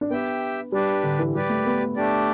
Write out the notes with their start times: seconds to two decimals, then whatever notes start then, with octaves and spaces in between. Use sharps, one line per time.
0.01 D4
0.10 B3 G4 E5 G5
0.72 G3 D4 G4 B4 D5
1.03 D3
1.19 E3
1.35 G3 G4 B4 D5
1.50 A3
1.65 B3
1.96 A3 D4 G4 D5